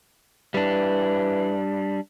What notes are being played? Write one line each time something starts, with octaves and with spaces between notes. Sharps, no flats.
E3 G3 D4